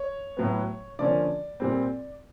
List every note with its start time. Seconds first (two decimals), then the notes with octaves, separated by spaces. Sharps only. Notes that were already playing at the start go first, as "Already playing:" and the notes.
Already playing: C#5
0.37 A2 F#3 B3
0.99 D3 F3 A#3 C#4 D5
1.60 A#2 G3 C4